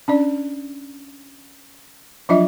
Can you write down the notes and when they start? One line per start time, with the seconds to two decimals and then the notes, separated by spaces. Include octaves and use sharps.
0.08 C#4 D4 D5
2.29 F3 F#3 D4 F4 D#5 E5